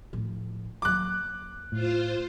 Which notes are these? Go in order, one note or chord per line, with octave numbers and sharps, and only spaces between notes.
A2 F3
D#2 F#3 D6 F#6
A2 F4 C5